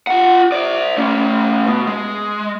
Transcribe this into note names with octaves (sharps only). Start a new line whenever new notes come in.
F4 F#5
C5 D5
A3 C#4
B2
G#3